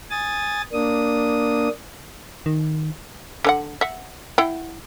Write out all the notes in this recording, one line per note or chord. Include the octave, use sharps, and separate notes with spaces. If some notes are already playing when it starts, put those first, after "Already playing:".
G#5 D#6 A6
A#3 D4 D#6
D#3
D3 C#4 F#5
E5 F#5
E4 F#5 G5